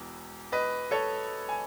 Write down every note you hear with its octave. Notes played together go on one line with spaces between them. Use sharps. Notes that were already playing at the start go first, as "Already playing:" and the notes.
Already playing: E1 E2
B4 D#5
A4 C#5
G#5